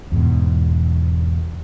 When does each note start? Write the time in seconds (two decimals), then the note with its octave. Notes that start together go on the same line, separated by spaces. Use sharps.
0.12 E2 G#2 B2